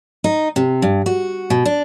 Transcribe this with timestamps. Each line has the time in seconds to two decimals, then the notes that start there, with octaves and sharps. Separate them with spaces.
0.24 D#4
0.56 C3
0.82 G2
1.06 F#4
1.50 B2
1.65 D4